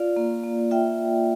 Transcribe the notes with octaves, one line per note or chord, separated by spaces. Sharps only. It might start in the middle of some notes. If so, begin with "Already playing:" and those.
Already playing: F4 D5 F5
A#3
A#3
F4 E5 G5